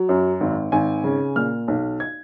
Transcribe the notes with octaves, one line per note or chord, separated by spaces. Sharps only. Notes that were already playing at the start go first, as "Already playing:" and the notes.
Already playing: F#3
F#2
G#1
G#1 G#5
C#3
A#2 F6
B1
G#6